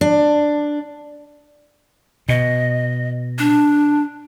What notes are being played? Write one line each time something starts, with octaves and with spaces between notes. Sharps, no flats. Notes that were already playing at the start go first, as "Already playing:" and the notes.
D4
B2 D#5
D4